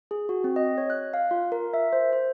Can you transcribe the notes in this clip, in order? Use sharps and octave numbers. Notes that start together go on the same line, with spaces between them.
G#4
F#4
C4
D#5
C#5
F#6
F5
F4
A#4
E5
C5
C5